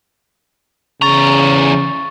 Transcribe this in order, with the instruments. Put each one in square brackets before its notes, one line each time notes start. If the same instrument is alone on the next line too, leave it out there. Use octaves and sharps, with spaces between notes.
[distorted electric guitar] E2 A#5 [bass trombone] C#3 [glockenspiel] C#6 A6